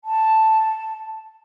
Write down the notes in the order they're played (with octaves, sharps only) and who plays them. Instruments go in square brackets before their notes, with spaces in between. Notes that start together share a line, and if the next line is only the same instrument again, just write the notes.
[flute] A5